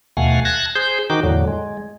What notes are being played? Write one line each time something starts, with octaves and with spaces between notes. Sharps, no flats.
D#2 B2 A3 F5 F#5 G#5
A5 F#6 G#6 A#6
G#4 C5 G6
D#3 D#4 F#4 G5 D6
E2 A2 D3 F#3
G#3